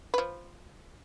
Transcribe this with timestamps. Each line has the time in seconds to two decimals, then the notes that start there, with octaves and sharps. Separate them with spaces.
0.14 F3 B4